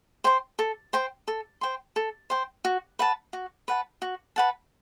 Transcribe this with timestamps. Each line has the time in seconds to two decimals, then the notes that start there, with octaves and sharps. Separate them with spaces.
0.24 C5 G5 C6
0.59 A4
0.93 C5 G5 C6
1.28 A4
1.61 C5 G5 C6
1.96 A4
2.30 C5 G5 C6
2.65 F#4
2.99 B4 F#5 A5
3.33 F#4
3.68 B4 F#5 A5
4.02 F#4
4.36 B4 F#5 A5